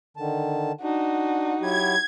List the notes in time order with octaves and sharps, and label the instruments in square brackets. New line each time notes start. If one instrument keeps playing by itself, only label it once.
[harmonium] D3 D#3 A5
[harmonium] D4 [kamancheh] D#4 F#4
[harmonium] F#3 E4 G4 [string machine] G#6